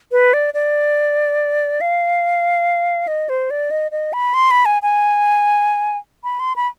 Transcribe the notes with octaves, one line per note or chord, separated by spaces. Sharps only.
B4
D5
D5
F5
D#5
C5
D5
D#5
D#5
B5
C6
B5
G#5
G#5
B5
C6
B5